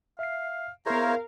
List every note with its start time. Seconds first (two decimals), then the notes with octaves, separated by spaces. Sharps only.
0.19 E5 F5 C7
0.86 B3 E4 G#4 A#4 C5 C#5 F5 A#5